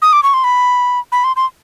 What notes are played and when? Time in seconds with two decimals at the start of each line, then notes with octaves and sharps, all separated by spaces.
0.02 D#6
0.13 D6
0.23 C#6
0.34 C6
0.44 B5
1.12 B5
1.24 C6
1.36 C6